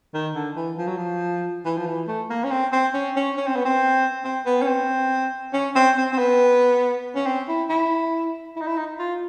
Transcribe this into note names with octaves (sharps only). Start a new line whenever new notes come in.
D#3
D3
E3
F3
F#3
F3
E3
F3
E3
A3
A#3
C#4
C4
C4
C#4
C#4
C#4
C4
B3
C4
C4
B3
C#4
C4
C#4
C4
C4
C4
B3
C#4
C4
E4
E4
E4
D#4
E4
D#4
F4